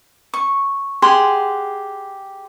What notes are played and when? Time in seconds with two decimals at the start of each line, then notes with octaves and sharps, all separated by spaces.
0.34 C#6
1.02 G4 G#4 F#5 C6